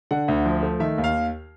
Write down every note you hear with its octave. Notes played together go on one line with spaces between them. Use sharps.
D3 F#5
D2
F3
A3
D#3 E5
D#2
F5